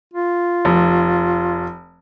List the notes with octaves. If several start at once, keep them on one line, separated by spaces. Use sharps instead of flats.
F4
F1